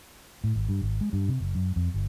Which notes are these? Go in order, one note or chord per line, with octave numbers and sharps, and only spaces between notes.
A2
G#1
G2
G#1
G#3
G2
C3
F#1
F#2
F2
G1